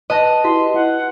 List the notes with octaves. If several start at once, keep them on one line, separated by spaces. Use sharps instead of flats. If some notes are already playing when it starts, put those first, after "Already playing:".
B4 D#5 A5 A#6
E4 F#4 G4 C6 B6
E4 F#5